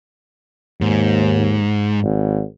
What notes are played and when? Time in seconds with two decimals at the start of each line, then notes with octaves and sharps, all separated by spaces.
0.81 D#2 G#2
2.03 G#1